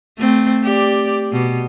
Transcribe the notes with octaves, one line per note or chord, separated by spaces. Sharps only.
A3 C4
G4 D5
B2